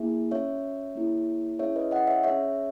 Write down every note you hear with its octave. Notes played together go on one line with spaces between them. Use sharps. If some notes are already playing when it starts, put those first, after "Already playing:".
Already playing: A#3 E4 G#4 E5
C#4 F#4 C#5 E5
A#3 E4 G#4
C#4 E4 G#4 C#5 E5
B4 D#5
D#5 F#5
C#5 E5
C#4 G#4 C#5 E5